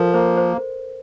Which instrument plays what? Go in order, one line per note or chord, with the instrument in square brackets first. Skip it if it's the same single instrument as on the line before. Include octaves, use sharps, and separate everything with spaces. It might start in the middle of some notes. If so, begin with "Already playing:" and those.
Already playing: [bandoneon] F3 [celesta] A4 A#4
[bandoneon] A#3 [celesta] C5
[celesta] C5